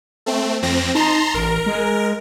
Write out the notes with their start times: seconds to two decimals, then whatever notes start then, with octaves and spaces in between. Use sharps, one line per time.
0.26 A3 C4
0.62 F2 C4 A#6
0.95 D#4 A5 A#5 C6
1.34 A1 A#4
1.66 G#3